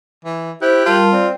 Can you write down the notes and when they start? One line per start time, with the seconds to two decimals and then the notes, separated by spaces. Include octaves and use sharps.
0.25 E3
0.62 E4 G4 C5 G5 F#6
0.86 G3 F4 A#4 A5
1.12 C4 D5